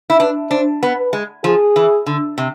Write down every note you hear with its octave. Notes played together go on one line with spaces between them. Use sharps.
E4
D4 B4
D4 C5
B3
B4
G#3
F3 G#4
E3
D3
C3